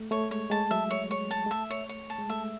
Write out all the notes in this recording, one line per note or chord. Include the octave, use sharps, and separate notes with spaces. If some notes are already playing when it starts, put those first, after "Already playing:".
Already playing: A3
A3 C#5
G#3 C#5
G#3 A5
F#3 E5
C#5
G#3 C#5
A5
G#3
A3 E5
C#5
C#5
A5
G#3
A3 E5